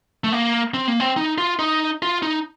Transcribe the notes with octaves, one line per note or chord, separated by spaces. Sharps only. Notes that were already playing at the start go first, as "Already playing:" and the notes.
A3
A#3
C4
A#3
C4
D#4
F4
D#4
F4
D#4